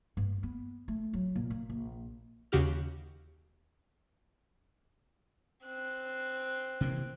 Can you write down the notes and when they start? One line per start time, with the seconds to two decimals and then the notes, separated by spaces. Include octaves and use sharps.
0.17 G2
0.43 B3
0.88 A3
1.13 F#3
1.35 A#2
1.50 A#3
1.70 A#1
2.52 D#2 C#3 F#4 G4 F6
5.65 C4 F#6
6.81 C3 E3 A#3